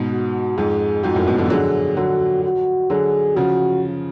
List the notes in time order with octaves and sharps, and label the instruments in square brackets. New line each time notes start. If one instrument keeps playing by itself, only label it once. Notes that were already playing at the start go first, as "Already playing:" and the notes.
Already playing: [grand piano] G#2 B2
[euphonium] F#4
[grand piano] F2 G#2 [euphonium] G#4
[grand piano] F2 G#2 [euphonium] F#4
[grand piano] F#2 A2
G#2 B2
B2 D3
F3
[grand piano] D3 F#3 [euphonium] G#4
[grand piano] D3 F#3 [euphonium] F#4
[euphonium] F#4
[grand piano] D3 F#3 [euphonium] G#4
[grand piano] C#3 F3 [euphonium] F#4